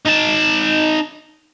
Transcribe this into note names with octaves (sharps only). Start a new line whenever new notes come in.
D#4 A5